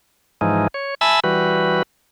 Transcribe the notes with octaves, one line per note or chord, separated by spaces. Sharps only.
G#2 E3 F3 G#3 D#4
C#5
E5 G#5 A5 B5 E6
E3 G3 F#4 B4